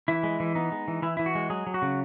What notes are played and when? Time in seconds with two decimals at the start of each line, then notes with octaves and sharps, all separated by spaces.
0.08 E3 E4
0.24 G#3
0.40 E3
0.55 B3 D#4
0.72 G#3
0.88 E3
1.02 E3 E4
1.17 E3 E4
1.26 F#4
1.35 G#3
1.50 F#3 G#4
1.67 F#3
1.74 F#4
1.82 C#3